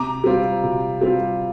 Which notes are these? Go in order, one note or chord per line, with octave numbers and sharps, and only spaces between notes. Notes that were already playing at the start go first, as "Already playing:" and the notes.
Already playing: C3 A#5 D6
G3 C4 F4
C3
G3 C4 F4